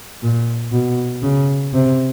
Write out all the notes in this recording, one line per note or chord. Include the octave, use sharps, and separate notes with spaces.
A#2
B2
C#3
C3